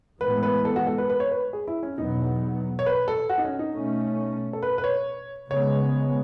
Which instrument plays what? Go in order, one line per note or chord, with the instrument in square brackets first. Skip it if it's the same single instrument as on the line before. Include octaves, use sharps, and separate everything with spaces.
[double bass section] A2 E3 G#3 B3 [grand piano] B4
[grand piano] B4
A4
F#4
A4
B4
B4
C#5
B4
G#4
E4
C#4
[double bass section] E2 B2 F#3 B3 [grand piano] D#4
[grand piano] C#5
B4
A4
F#4
D#4
C#4
D#4
[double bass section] B2 A3 C#4
[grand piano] A4
B4
B4
C#5
[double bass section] C#3 G#3 B3 [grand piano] C#5